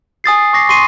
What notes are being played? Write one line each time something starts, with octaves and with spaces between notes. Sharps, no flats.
G#5 D#6 A6 C7
C#6 D6 A#6 C7
C6 C#6 C7 D#7